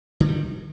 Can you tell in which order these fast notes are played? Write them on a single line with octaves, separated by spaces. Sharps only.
D3 D#3 G3